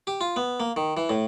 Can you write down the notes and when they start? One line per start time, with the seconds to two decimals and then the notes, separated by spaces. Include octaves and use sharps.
0.07 G4
0.21 F4
0.36 B3
0.60 A#3
0.76 D#3
0.97 E3
1.10 A2